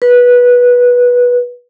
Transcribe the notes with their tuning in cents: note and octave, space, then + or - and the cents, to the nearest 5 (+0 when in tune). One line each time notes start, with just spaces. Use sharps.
B4 -15